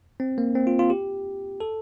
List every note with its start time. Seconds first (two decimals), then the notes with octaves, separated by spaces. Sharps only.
0.20 C4
0.38 A#3
0.55 C4
0.67 F4
0.79 F4
0.90 G4
1.60 A4